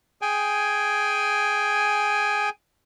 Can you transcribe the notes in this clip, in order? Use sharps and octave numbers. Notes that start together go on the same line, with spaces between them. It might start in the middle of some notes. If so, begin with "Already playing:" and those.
G#4 G5 G#5